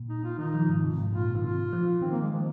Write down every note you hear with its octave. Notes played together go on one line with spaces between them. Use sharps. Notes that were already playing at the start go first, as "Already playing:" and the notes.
Already playing: A#2
D#4
A#2 F4
D#3 D#4
F3
G#2
C3
G#2
A#2 F4
D#3
C3 F4
F3
D#3 C4
A#3
G#3
F3